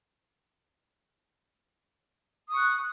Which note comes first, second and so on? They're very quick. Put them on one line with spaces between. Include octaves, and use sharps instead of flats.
D#6 C#6 F#6